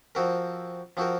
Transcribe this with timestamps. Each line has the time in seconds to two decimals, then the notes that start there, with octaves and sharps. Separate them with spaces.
0.15 F3 C4 F#4 A#4
0.97 F3 C4 F#4 A#4